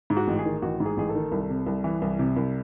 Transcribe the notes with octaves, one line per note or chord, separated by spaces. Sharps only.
G#2
F#4
A1
G#4
D#3
A1 F#4
G#2
G#4
A1 G#4
A4
D#3
C2
C3
C2
E3
C2
C3
C2